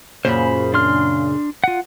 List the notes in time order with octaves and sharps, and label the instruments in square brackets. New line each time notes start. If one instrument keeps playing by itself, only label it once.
[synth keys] F#2 A#2 C#3 [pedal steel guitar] C5 B5
[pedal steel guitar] D4 C6 F6
F4 F#5